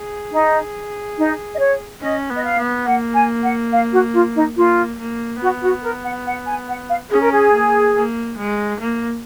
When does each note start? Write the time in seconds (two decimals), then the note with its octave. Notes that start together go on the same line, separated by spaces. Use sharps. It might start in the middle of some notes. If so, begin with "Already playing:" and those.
Already playing: G#4
0.32 D#4
1.17 D#4
1.53 D#5
1.59 C#5
2.01 C#4 D#5
2.30 B3
2.36 D#5
2.43 F5
2.58 B3
2.86 A#3 F#5
3.14 G#5
3.43 F#5
3.71 F5
3.92 F#4
4.14 F4
4.35 D#4
4.56 A#3 F4
4.99 A#3
5.41 B3 F#4
5.62 F#4
5.83 A#4
6.05 F#5
6.26 F#5
6.47 G#5
6.68 F#5
6.89 F5
7.10 C#4 G#4
7.21 A#4
7.32 G#4
7.53 A#3
7.95 A#3
8.38 G#3
8.80 A#3